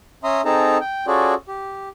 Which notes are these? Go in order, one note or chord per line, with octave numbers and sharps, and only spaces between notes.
C#4 E5 A#5 C6 D#6
C4 D#4 G#4 A4 A5 A#5
G5
C#4 F4 F#4 G#4 A4 D5
G4